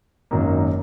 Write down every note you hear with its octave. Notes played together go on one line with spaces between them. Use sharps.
G#1 F#2 D#3 A#3 D#4